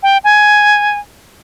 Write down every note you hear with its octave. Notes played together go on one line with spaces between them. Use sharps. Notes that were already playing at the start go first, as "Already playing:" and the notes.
G5
G#5